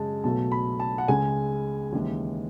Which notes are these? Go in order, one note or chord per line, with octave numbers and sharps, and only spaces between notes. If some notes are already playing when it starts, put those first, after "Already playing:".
Already playing: F#2 C#3 G#3 A5
B1 B2 F#3 A3 A5
B5
A5
F#5
C#2 C#3 G#3 G#5
D#2 C#3 E3 G#3